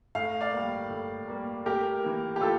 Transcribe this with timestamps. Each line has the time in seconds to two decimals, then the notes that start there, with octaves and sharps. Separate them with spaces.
0.15 A2 F5
0.41 D5 F5
0.53 G3 A#3
0.90 A2
1.28 G3 A#3
1.66 A2 G4 A#4
2.03 E3 A#3
2.36 G4
2.40 A2 F4 A4